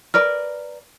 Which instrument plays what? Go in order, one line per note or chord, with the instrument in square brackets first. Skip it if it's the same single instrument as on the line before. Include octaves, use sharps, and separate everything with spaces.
[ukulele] A#4 B4 D5 [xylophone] F6